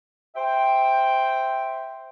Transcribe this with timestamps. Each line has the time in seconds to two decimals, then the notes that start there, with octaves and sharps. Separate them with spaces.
0.36 C5 E5 G5